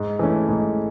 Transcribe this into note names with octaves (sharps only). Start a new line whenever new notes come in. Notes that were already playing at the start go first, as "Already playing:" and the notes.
Already playing: G#2
E3 A3 C#4
G#2